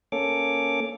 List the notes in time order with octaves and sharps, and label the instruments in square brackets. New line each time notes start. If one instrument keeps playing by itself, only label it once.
[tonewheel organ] A#3 C#4 A4 C#5 D6